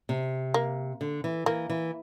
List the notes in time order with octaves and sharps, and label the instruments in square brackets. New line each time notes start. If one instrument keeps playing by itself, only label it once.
[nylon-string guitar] C3
[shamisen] A#3
[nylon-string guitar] D3
E3
[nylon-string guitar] E3 [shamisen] A#3
[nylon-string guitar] E3